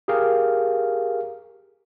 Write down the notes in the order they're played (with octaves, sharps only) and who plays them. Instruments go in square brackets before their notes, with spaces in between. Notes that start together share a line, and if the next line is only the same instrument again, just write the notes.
[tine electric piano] G4 G#4 A#4 F5